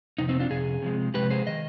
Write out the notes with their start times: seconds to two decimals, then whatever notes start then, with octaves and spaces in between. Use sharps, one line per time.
0.18 F2 C3 D#4
0.29 C4 D#4
0.40 D4 F4
0.50 F2 C3 G#4
0.82 C3 F3 G#3
1.14 C3 F3 G#3 G4 B4
1.30 G#4 C5
1.47 D#3 D#5